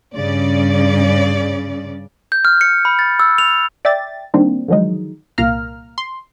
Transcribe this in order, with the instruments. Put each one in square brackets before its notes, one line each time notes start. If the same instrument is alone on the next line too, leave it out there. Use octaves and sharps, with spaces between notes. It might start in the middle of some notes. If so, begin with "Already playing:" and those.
[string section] G2 C#3 D5
[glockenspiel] G6
F6
C#7
B5
A6
E6
F7
[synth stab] D5 E5 G5 A6
D#3 G3 A#3 C4 D4
D3 D#3 F3 F#3 G#3 D#4
C2 A#2 A#3 F5 A#5 F6
C6